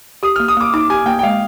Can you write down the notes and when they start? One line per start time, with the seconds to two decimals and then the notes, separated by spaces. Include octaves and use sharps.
0.23 G4 D#6
0.36 A#3 F6
0.48 D#6
0.57 A#3 D6
0.74 D#4 D6
0.90 G4 G#5
1.06 A#3 G5
1.19 G5
1.23 G#3 F5